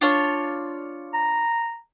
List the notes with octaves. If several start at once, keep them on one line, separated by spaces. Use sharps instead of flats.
D4 F4 C#5
A#5